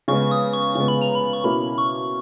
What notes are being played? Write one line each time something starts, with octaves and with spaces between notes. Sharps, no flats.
C#3 G#3 B3 C#6
D#6
C#6
C#3 G#3 B3 C#6
B5
A#5
B5
C#6
B2 A#3 C#4 E4 B5
C#6